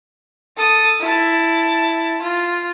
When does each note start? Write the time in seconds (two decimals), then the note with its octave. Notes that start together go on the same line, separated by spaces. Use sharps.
0.57 A4 D#6
1.00 E4 A5
2.22 F4